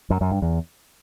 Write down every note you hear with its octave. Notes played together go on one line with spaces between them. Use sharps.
F#2
F#2
G2
E2